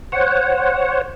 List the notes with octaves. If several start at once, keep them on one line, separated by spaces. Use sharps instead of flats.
C5 C#5 F#5